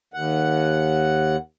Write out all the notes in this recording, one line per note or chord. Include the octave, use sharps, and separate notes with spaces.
D#2 F#5